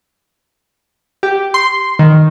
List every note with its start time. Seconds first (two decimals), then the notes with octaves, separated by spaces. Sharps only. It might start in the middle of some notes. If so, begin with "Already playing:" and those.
1.23 G4
1.54 C6
1.99 D#3